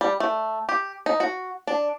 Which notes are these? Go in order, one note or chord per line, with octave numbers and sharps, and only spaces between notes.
G3
A3
G4
D#4
F#4
D4